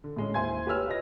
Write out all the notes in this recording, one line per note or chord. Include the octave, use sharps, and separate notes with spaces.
D3
A2 G#3 C#4
D#2 E4 C5 G#5 C6 G#6
G4 B4 C#5 E6 F6
F4 B4 C#5 D#5 A#6